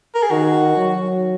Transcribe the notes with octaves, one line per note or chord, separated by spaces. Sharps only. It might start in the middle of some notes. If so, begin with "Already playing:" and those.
A#4
G#4
D#3 F#4
F#3